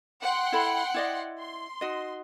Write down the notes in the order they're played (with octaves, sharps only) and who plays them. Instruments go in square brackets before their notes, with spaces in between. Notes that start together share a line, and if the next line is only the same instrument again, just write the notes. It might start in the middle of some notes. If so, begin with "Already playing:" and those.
[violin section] F#5 G5 C6
[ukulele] E4 A4 B5
E4 D5 D#5
[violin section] C6
[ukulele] D#4 F#4 D#5